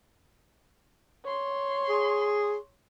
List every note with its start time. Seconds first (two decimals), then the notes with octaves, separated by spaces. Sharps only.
1.25 C#5 C6
1.89 G#4